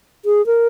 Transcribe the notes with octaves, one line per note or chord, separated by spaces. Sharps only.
G#4
A#4